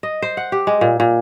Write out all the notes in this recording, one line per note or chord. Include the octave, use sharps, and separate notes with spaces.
D#5
C5
F#5
G4
G#3
A#2
A#2